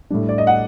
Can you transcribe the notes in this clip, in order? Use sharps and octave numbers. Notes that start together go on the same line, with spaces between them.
A2 G3 D4
D5
D#5
F#5